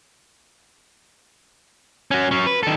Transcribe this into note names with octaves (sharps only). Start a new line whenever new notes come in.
C#4 F#4
F#3 C#4
B4
D#3 A4